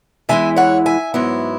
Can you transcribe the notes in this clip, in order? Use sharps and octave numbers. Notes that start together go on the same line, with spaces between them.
E2 E3 G#3 E4 E5 G#5
C#5 F#5
E5 G#5
G#2 F#3 B3 E4